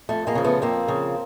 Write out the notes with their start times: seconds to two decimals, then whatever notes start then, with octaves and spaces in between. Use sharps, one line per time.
0.09 F2 A3
0.27 G#3 A#3
0.35 C#3 F3
0.44 A3 B3
0.62 F2 A#3 C4
0.88 C#3 F3